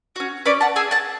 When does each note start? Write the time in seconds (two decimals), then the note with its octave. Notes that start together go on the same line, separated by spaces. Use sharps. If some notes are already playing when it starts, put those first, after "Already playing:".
0.16 C#4 F#4
0.46 C#4 B4 D5
0.61 F#5 A5
0.76 G#4 E5 G#5
0.91 F#5 A5